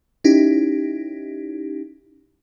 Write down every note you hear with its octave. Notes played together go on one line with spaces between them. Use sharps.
C#4 D#4 E4 G4